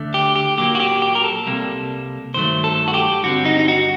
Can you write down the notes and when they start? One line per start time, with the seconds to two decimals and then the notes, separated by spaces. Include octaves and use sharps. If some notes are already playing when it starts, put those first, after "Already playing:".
Already playing: D2 D3 A3
0.14 G4
0.36 G4
0.58 A#2 F#3 A#3 G4
0.75 F#4
0.80 G4
1.02 G4
1.15 A#4
1.24 A4
1.46 C2 C3 G3 A#3
2.34 G2 D#3 F#3 A3 C5
2.64 A4
2.88 F#4
2.94 G4
3.23 G2 D3 G3 C4 F#4
3.45 D#4
3.59 D#4
3.68 F#4